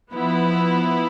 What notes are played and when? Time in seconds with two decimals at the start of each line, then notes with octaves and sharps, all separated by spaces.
0.11 F3 B3 E4